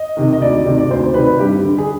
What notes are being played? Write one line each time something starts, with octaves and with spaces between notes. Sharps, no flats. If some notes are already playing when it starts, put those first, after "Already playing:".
Already playing: D#5
C3 D#3
D#5
D2 D5
C3 D#3
D5
D2 C5
C3 D#3 B4
G2 G4
D3
G#4